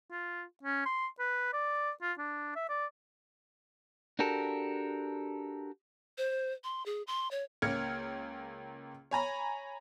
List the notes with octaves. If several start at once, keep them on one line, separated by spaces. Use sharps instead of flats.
F4
C#4
C6
B4
D5
F4
D4
E5
D5
D4 F#4 G4 A4 A#4
C5
C6
G#4
C6
C#5
C#2 A#3 C#4 F6 G#6 C#7
C#5 G#5 A#5 B5